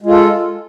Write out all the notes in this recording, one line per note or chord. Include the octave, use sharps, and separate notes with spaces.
G#3 F4 A4